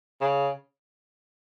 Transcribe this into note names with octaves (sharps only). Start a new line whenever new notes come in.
C#3